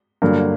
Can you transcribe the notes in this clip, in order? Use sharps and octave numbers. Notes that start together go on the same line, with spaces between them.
G2 D3 F#3 A#3